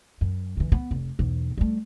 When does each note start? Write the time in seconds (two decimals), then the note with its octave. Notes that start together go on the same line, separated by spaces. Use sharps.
0.21 F#2
0.57 D3 E3
0.72 B3
0.91 F1
1.19 B1 E2
1.58 G3 A3